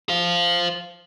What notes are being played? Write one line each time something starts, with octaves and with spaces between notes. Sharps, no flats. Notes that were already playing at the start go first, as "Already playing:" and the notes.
C5 F5